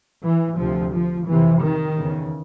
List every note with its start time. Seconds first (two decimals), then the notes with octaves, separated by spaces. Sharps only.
0.24 E3
0.58 D2 C3 F3
0.93 F3
1.28 F2 C3 E3
1.62 D#3
1.98 E2 C#3